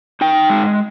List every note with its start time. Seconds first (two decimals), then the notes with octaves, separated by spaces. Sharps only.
0.21 D#4 G5
0.50 G#3